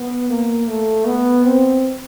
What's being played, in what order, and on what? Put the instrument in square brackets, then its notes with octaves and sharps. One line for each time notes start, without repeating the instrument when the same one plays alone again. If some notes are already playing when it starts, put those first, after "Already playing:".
Already playing: [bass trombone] B3
A#3
A3
B3
C4